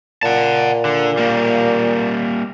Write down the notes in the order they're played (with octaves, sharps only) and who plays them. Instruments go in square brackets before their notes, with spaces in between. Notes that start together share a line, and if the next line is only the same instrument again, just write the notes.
[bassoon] A#2 [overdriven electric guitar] F#5 A5
[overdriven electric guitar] D3
G3 A#3